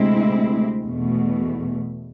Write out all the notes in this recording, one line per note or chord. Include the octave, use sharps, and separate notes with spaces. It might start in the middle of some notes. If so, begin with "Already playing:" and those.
Already playing: D2 C3 G#3 C4 E4
E2 B2 A3